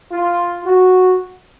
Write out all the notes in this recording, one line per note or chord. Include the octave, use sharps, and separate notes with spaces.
F4
F#4